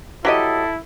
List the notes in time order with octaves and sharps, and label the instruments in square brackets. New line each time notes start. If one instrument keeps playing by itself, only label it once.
[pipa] F#3 G4 D#5 [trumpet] E4 [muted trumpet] A4